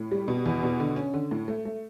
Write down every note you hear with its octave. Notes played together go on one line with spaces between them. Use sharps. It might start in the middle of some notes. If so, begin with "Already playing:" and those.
Already playing: A2
G3
B2
E2
B2
D3
C#4
D3
A2
A3
A3